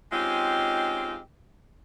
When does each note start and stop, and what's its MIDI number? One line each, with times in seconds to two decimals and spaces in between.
0.12 1.17 56
0.12 1.17 60
0.12 1.17 61
0.12 1.17 63
0.12 1.17 65
0.12 1.17 67